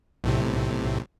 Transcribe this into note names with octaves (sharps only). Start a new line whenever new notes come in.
B1 A2 C3